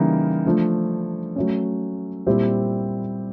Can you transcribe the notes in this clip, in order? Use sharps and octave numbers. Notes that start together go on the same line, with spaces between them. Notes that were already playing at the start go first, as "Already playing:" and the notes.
Already playing: C#3 E3 G3 A#3 D#4
F3 A3 D4
F#3 A3 C#4
A#2 G3 C4 E4 G4